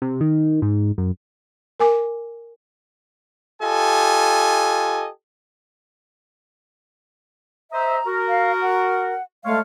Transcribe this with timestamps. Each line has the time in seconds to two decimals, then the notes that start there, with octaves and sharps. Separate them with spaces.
0.02 C3
0.21 D#3
0.62 G#2
0.98 F#2
1.80 A#4 G#5 D6
3.62 F4 G4 A4 D#5 G#5
7.73 C5 D#5 E5 A#5
8.06 F#4 A#4
8.29 F5
8.62 F#5
9.45 G#3 A3 C#5 F5